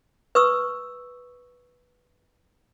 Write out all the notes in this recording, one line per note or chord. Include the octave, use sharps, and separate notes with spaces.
B4 C#6 D#6 E6